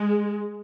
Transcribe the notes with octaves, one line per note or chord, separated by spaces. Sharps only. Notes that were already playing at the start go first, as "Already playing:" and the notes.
Already playing: G#3